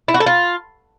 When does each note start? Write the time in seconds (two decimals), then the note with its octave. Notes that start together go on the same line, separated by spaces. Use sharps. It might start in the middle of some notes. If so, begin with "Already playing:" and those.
0.08 E4
0.14 F#4
0.20 A4
0.26 F4